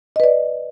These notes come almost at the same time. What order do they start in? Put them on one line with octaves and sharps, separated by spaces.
D#5 B4 D5